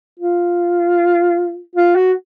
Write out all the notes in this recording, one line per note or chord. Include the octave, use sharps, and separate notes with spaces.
F4
F4
F#4